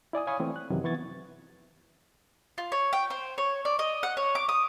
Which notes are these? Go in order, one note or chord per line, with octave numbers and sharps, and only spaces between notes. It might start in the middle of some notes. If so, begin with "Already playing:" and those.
E4 D5 G#5 D#6
C#5 F5 G#5 B5 C#6 D#6
E3 A3 C4 E4
F#6
F#2 C3 D#3 E3 F#3
E3 B3 C#6 G#6 A6
F4
C#5
G5
C5
C#5
D5
D#5
F#5
C#5
D6
D#6